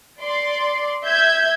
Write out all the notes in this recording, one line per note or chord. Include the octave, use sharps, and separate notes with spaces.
D5 C6
E5 G6 G#6